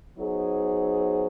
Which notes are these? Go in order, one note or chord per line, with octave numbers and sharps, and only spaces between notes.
F#3 B3 D#4 G#4 C5